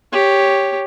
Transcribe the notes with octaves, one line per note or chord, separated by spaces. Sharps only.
G4 C#5